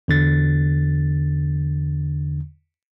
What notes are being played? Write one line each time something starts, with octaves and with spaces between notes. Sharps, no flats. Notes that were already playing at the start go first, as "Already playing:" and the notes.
E2 D3 A6